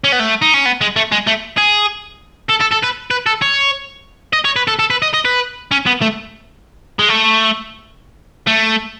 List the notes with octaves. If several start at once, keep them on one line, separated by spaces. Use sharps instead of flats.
C#4
B3
A3
D#4
C#4
B3
G#3
A3
G#3
A3
G#4
A4
A4
A4
B4
B4
A4
C#5
D#5
C#5
B4
A4
A4
B4
D#5
D#5
B4
C#4
B3
A3
G#3
A3
A3